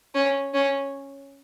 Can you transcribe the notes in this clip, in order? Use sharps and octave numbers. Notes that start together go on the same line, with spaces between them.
C#4
C#4